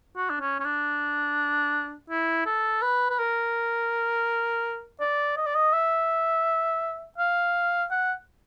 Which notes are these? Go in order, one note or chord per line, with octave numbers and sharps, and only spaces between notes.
F#4
D4
C#4
C#4
D4
E4
A4
B4
B4
A#4
D5
D#5
D5
D#5
E5
F5
F#5